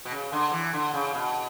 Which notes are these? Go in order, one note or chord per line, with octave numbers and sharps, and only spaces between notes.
B2
C#3
D3
E3
D3
C#3
B2